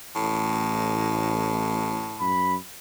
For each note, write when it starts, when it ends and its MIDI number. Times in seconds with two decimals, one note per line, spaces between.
0.16 2.09 33
0.16 2.46 45
2.21 2.57 42
2.21 2.57 83